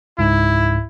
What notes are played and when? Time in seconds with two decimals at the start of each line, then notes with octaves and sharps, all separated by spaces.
0.19 C#2 G#2 E4